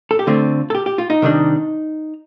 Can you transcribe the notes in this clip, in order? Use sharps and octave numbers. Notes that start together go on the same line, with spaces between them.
A4
G4
D3 A3 C4 F4
A4
G4
G4
F4
D#4
C3 D#3 G3 D4